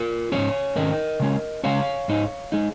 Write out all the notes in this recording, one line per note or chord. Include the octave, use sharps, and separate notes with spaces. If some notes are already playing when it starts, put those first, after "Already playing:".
Already playing: F4 A#4
G#2 D#3 C#4 G#4 C#5
G#2 D#3 C#4 A#4 D#5
C#3 G#3 C#4
C#3 G#3 C#4 C#5 F5
G#2 G#3 D#4
G#3 D#4